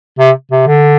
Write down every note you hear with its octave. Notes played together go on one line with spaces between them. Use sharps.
C3
C3
D3